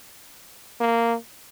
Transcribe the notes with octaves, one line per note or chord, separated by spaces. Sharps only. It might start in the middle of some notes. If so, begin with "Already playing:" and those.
A#3